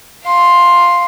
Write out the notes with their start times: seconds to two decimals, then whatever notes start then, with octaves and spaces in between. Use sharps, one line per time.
0.24 F5 C6